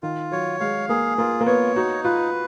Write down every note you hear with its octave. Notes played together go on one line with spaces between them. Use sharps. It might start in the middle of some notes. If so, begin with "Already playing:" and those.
D#3 F4
F#3 C#5
G#3 F5
A#3 G#4
A#3 F4
A#3
B3 C#5
D#4 F#4
F4 B4